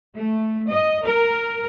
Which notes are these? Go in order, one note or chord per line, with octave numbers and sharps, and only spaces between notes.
A3
D#5
A#4